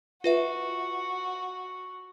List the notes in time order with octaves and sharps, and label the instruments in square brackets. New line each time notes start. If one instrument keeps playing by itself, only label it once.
[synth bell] F4 B4 E5 [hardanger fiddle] F#4